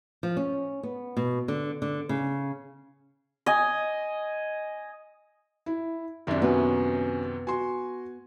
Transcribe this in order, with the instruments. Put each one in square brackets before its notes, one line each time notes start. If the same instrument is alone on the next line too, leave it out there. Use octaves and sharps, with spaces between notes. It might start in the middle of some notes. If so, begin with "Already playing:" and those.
[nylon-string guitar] F3
C#4
B3
B2
D3
D3
C#3
[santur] D#5 G#5
[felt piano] E4
[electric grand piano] F#2 C3 D#3 [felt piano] D4 E5
[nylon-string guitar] B3 [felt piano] C#4 F#4
[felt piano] F#4 C6 [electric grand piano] G#5